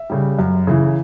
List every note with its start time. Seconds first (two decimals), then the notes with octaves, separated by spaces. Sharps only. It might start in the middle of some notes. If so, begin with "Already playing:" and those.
Already playing: E5
0.10 C#3 G3
0.39 F#2
0.67 C#3 E3